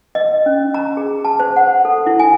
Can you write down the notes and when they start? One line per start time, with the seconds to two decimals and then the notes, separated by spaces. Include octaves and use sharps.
0.15 D#5
0.46 C#4
0.74 A#5
0.97 G#4
1.25 A5
1.40 C5
1.56 F#5
1.85 A4
2.06 E4
2.20 G#5